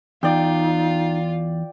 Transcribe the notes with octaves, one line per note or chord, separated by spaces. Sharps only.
E2 D#4 F4 D5 G5